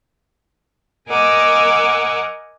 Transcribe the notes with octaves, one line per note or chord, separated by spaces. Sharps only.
A#4 D#5 F#5 G#5 D6 E6